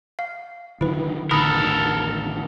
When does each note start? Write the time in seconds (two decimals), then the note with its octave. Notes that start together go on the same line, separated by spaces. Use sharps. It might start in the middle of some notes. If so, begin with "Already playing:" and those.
0.19 F5
0.81 D3 D#3 F#3 E4 B4
1.31 A1 D3 D#3 A4 A#4 B5 D#6 F#6